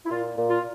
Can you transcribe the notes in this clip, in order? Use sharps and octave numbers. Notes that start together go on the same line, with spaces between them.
E4
A#2 F4
A#2
F4